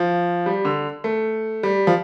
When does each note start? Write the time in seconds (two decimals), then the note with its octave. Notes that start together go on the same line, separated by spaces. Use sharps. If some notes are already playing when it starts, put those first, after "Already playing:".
Already playing: F3
0.46 G3
0.65 D3
1.04 A3
1.63 G3
1.87 F3